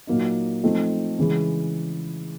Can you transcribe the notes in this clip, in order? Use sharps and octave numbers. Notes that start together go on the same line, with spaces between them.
A#2 F#3 A#3 D#4
F3 A3 C4 D#4
C#3 E3 G#3